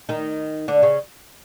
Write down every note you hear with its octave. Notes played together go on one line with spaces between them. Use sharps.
D#3 D#4
D3 D4
C#3 C#4